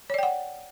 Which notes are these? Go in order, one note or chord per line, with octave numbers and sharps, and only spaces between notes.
C#5 D5 F#5 G5